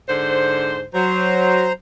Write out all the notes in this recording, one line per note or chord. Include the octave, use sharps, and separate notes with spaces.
G#2 D3 C5
F#3 C5 A#5